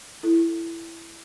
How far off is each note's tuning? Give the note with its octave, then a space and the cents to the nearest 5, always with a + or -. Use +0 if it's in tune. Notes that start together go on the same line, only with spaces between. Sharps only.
E4 +15 A4 +0